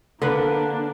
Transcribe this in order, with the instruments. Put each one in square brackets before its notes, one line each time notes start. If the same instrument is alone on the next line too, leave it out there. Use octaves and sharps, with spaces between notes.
[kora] D3 B4 [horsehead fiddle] A#3 D4